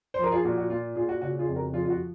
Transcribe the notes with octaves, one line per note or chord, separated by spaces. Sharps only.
C5
F3 A#4
F4 G#4
A#2 F#4
F#4
A#2 F4
A#2 F4 G#4
F#4
C#3 F#4
F4 G#4
F2
F#4 A#4
F3 F4 G#4
F4
F#4